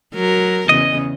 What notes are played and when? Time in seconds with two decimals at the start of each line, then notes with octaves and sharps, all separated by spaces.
0.15 F#3 A#4
0.69 E2 C#3 D#5